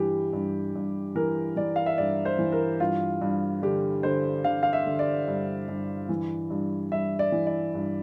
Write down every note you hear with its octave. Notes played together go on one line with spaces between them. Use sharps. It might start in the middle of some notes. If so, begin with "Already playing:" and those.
Already playing: G2 E3 G4
G2
G2
E3 A#4
E3 D5
F5
E5
G2 D5
C5
E3
A#4
G2 F4
G2
D3 G4
D3 C5
D3 F5
F5
E5
D3
D5
G2
G2
E3
G2
G2 E5
D5
E3
D5
G2